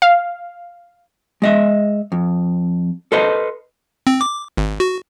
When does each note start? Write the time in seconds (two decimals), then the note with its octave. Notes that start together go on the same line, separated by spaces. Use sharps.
0.02 F5
1.42 G#3 D#5 E5
2.12 F2
3.12 A4 B4 C5 D#5
4.07 C4
4.21 D6
4.57 G#1
4.80 F#4